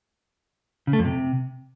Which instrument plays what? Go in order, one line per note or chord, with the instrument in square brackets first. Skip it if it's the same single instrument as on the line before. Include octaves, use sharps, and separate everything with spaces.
[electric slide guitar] C#3
A3
F2
C3